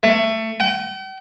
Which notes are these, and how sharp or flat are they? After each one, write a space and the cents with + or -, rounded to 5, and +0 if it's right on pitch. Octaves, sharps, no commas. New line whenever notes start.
A3 +20
G5 -45